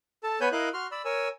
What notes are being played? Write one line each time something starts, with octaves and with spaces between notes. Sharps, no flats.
A4 A5
B3 B4 C#5 G#5 B5 G6
E4 A#4 D#5 F5 F#6
F#4 C6 F6
D5 B5 E6
A#4 C#5 G#5 E6